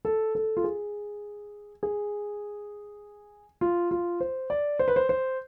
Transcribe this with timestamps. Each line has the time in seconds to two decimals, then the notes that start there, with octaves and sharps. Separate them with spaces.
0.05 A4
0.35 A4
0.57 F4
0.64 G#4
1.83 G#4
3.61 F4
3.91 F4
4.20 C5
4.50 D5
4.79 C5
4.88 B4
4.96 C5
5.09 C5